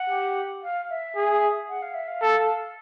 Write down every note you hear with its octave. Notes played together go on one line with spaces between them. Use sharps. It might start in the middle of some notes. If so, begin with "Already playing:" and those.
Already playing: F#5
G4
F5
E5
G#4
F#5
F5
E5
F5
A4